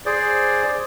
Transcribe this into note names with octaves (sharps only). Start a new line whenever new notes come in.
G#4 C5 D5